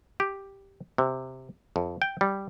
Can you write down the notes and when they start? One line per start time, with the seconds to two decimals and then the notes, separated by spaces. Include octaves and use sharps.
0.20 G4
0.98 C3
1.76 F2
2.02 G5
2.21 G3